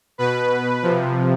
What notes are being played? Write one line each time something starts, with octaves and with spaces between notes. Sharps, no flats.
B2 B4
C3 F3